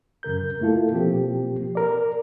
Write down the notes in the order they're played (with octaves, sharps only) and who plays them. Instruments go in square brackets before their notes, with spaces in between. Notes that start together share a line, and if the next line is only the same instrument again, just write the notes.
[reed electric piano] F#2 C#3 A#4 G6
A3 A#3 E4 F4 A4
B2 F3 A#3 C4 G4
A#4 D5